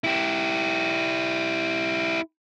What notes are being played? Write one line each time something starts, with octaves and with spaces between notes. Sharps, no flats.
E4 G4